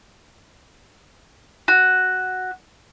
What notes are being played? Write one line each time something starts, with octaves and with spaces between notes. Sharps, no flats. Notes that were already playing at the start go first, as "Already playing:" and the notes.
F#4